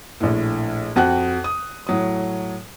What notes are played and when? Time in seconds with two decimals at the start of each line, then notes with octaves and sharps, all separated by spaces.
0.21 A#1 A2
0.96 F2 F#4 G5 F#6
1.44 D#6
1.87 A2 F#3 D#6